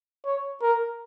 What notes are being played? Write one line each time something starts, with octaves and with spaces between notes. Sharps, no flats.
C#5
A#4